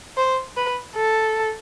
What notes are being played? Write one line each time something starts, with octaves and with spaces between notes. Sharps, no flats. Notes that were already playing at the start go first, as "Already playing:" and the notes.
C5
B4
A4